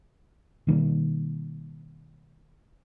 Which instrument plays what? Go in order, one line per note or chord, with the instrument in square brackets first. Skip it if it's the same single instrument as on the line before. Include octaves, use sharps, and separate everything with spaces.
[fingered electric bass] B2 D#3 G3 A#3